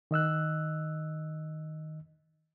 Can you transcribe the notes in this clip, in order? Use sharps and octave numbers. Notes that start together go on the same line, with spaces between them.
D#3 D#5 E6 F#6